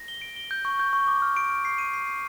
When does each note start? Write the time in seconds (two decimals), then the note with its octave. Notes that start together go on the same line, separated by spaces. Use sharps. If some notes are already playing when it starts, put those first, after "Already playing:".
Already playing: A#6
0.08 G7
0.22 D7
0.36 G7
0.51 G6
0.65 C#6
0.79 G6
0.93 C#6
1.08 D6
1.22 F6
1.37 D7
1.50 F6
1.65 C7
1.78 D#7
1.93 C7
2.07 C7